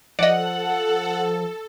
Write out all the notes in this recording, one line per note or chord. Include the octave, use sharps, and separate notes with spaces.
F3 A4 D5 D#5 F#5